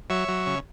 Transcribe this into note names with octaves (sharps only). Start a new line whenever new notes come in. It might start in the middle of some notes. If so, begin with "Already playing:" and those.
F#3 C#5 E5
F#3
C#3